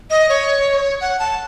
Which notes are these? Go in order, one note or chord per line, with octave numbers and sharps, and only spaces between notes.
D#5
C#5
F#5
A5